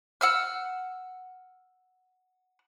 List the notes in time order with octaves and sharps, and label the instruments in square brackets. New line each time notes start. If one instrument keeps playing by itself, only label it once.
[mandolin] F#5 E6 F6